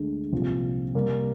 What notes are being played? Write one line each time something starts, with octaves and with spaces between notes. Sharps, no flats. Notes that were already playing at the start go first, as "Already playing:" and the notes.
Already playing: D2 D3 G#3
C2 A#2 F3 C4
C3 G3 A#3